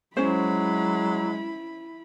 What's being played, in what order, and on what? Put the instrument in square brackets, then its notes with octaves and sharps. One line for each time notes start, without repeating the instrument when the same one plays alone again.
[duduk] F#3 [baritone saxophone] G#3 [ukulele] C#4 C5 [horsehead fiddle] E4 B5